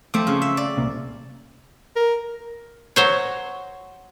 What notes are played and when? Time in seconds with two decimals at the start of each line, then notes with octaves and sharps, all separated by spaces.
0.14 F3 A3 C4 D6
0.27 C#3
0.42 E5
0.57 D5
0.77 C2 A#2
1.96 A#4
2.96 F#3 C5 C#5